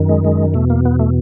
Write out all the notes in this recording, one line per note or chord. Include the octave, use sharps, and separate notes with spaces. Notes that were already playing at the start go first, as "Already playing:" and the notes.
Already playing: F#2 D#3
G#3
G#3
E2 B2 A3
A#3
B3
A3